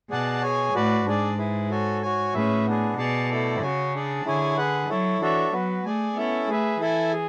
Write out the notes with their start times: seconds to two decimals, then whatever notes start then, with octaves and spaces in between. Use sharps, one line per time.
0.10 B2 G#4 D5 F#5 A5
0.42 G#4 C#5 G#5
0.75 A2 F#4 B4 D5
1.06 G#2 D4 G#4 D5
1.38 E4 G#4 B4
1.70 F#4 A4 C#5 G#5
2.02 F#4 C#5 G#5
2.34 A2 C#4 G#4 B4 E5
2.66 B3 D4 G#4
2.97 B2 G#4 D5 A5
3.30 A3 E4 A4 D5
3.61 C#3 F#4 C#5 G#5
3.94 D4 G#4 D5
4.25 D3 E4 G#4 C#5 G#5
4.57 G#4 B4 F#5
4.89 F#3 E4 A4 C#5
5.21 E3 D4 F#4 A4 C#5 E5
5.53 F#3 B3 F#4 B4
5.85 A3 G#4 D5 G#5
6.16 B3 C#4 E4 A4 E5
6.49 A3 G#4 B4 E5
6.80 E3 E4 A4 E5 G#5
7.13 G#4